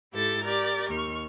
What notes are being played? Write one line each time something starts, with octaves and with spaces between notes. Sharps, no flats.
G#2 E4 G4 A4 A6
G4 A#4 D5 A6
D#2 C#6 F6